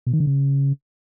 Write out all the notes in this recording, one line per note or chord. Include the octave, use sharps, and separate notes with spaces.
B2
D#3
D3
C#3